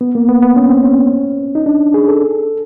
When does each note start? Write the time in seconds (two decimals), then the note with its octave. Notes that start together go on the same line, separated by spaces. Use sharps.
0.01 B3
0.15 A#3
0.29 B3
0.43 B3
0.56 C#4
0.69 C4
0.83 C#4
1.55 D#4
1.66 D4
1.94 G#4
2.08 A4